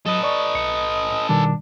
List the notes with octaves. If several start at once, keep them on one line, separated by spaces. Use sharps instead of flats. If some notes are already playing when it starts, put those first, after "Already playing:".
F#3 A4 B4 D#5
D5 D#5 C#6
B1 C#7
B2 D#3 G3 D4